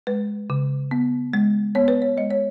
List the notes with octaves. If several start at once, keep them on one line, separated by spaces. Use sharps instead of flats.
G#3 B4
C#3
B3
G#3
B3 C#5
B4
C#5
G#3 D#5
C#5